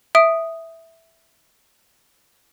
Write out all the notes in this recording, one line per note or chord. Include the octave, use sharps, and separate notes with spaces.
E5 D#6 D7